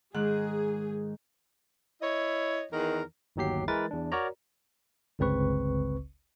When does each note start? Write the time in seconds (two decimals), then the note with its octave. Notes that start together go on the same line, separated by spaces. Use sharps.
0.14 G#2 D#3 G#4 F#6
2.01 E4 C#5 D#5
2.72 E2 D#3 A#4
3.36 G1 D#2 F#3 G4 C7
3.68 E3 G#3 A#4 B4 A6
3.91 E2 D4
4.12 F#4 A#4 C#5 D5 A#5
5.19 G1 C#2 C#3 C4 B4 C#6